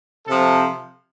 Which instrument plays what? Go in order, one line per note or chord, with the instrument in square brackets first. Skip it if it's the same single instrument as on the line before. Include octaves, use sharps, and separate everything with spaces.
[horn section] C3 F3 A4